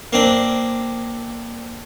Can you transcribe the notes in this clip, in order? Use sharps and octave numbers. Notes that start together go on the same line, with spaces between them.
A#3 C4 D4